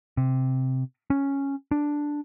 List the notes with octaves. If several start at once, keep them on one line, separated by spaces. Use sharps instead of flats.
C3
C#4
D4